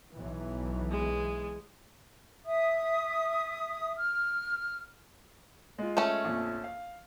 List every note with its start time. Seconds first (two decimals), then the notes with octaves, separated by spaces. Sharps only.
0.13 B1 E3
0.91 G#3
2.45 E5 D#6
3.96 F6
5.78 G#3 F4
5.97 A3 C#4
6.25 A#1 F2
6.64 F5